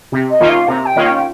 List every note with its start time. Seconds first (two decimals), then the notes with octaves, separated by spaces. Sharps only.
0.12 C3
0.30 D#5
0.40 D#3 A#3 C#4 F4
0.49 F5
0.68 C3 A#5
0.86 G5
0.96 D#3 A#3 C#4 F4
1.05 G5
1.16 G5